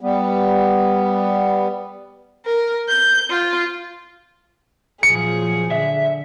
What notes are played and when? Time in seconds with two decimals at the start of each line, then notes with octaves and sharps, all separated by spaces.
0.01 G3 B3
2.46 A#4
2.87 G6
3.30 F4
5.03 A#2 F3 F#3 G#4 C#7
5.71 D3 E5